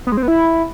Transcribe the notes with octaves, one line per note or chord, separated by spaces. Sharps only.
B3
G#3
C4
B3
E4